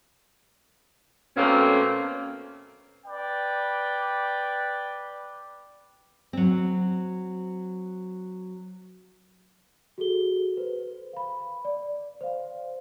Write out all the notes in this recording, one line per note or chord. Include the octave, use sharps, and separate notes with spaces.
B2 A3 A#3 C4 C#4
B4 D5 G5
F#3 C4
F#4 G#4 A4 G7
B4 C5
F5 B5
D5
C5 F5